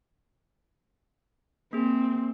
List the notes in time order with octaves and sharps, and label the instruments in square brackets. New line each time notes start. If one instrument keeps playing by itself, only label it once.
[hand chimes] A#3 G#4 [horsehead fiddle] C4